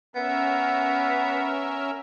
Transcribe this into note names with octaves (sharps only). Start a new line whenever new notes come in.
B3 C#4 A#4 E5